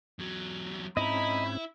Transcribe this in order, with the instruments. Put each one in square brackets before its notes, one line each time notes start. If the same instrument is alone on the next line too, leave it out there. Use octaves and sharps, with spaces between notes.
[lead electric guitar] E2 F#3
[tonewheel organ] G#2 C4 C#4 [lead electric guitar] E4 [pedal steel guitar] D#5 A#5 [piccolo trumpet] B5